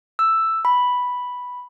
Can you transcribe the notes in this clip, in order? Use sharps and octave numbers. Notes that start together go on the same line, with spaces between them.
E6
B5